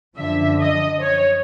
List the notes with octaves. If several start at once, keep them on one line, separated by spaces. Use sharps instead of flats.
F#2 D3 F3 E5
D#5
C#5